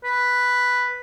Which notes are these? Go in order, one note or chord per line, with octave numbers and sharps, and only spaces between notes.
B4